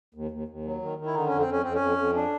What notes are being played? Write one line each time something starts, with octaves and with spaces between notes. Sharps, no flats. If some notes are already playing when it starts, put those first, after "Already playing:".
D#2
D#2
D#2
F#3
D#3
D#3
E4
D3 D#4
F2 C#4
C4
F2 C#4
F2 C4
C#4
F2
F2
D4